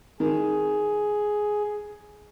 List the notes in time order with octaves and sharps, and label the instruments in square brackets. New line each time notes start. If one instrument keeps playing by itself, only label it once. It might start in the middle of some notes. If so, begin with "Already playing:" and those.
[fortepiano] D#3 [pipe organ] G#4